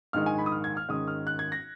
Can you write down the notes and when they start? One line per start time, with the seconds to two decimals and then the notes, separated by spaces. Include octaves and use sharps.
0.13 A#1 G#2 D#3 G#3 F6
0.26 G#5
0.38 B5
0.46 D#6
0.52 F6
0.64 G#6
0.77 F6
0.89 G#1 G#2 D#3 G#3 C#4 D#6
1.08 F6
1.27 F#6
1.39 G#6
1.52 A#6